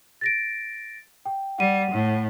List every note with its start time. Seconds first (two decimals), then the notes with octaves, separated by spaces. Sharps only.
0.21 A6 A#6 D7
1.25 G5
1.58 G3 F#5 D#7
1.91 A2